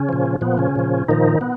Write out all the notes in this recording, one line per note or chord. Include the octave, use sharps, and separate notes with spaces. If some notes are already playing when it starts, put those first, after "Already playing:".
Already playing: C#3 C#4
A#2 F3
A#2 F3 B3
C#3 C#4
A#2 F3
A#2 D#3 F3 D#4
B3